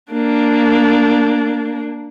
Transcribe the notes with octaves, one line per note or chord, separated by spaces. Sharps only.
A#3 D4